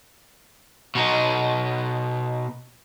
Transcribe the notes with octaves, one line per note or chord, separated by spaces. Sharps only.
B2 D#4